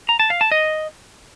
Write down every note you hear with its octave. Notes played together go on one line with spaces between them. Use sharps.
A#5
A5
F5
A5
D#5